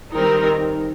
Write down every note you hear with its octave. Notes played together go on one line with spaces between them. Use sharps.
D#3 G3 C4 D#4 A#4